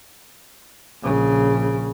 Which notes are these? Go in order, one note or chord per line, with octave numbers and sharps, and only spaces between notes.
A#1 C#3